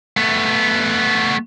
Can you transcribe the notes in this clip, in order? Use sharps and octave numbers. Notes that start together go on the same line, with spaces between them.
A3 B3